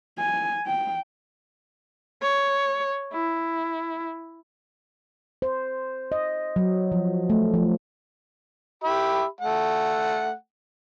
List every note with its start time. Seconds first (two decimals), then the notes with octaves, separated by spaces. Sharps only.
0.18 G#5
0.67 G5
2.22 C#5
3.13 E4
5.42 C5
6.12 D#5
6.56 F#3
6.92 F3
7.30 A3
7.54 F3
8.84 G4 E5 B5
9.41 A3 F#5